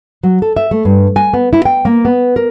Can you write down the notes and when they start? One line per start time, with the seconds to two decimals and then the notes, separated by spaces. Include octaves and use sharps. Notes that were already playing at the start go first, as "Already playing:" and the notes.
0.23 F#3
0.42 A4
0.56 E5
0.71 A3
0.85 G2
1.16 G#5
1.34 B3
1.53 E4
1.65 G5
1.85 A#3
2.05 B3
2.36 A#4